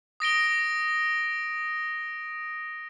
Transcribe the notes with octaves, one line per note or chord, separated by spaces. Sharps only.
D#6 A#6 D7 G7